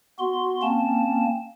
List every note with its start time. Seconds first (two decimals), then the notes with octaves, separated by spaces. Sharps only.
0.19 B3 F#4 C6
0.62 A#3 C4 C#4 A5